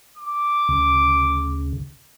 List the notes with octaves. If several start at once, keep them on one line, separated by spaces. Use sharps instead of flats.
D6
D2 C#3